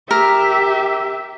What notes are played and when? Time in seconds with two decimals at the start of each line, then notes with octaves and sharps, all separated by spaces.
0.11 G4 A#4 E5